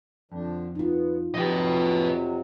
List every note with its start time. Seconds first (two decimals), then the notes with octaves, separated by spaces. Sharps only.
0.32 F2 D3 F3 D4
0.75 B3 D#4 F4
1.34 F2 C3 F3 F#3 G4 B4 D#5